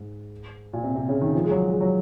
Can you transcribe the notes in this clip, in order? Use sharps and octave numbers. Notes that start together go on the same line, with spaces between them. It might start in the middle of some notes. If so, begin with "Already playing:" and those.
Already playing: G#2
A#2
C3
C3
C#3
D#3
F3
G#3
F#3
G#3
F#3